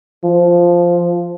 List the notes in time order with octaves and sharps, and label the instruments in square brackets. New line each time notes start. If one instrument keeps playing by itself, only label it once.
[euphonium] F3